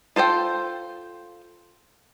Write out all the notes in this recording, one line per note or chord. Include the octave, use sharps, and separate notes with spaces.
F4 A4 C5 G5